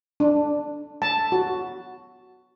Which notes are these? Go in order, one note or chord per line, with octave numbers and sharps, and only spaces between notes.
D4
A5
F#4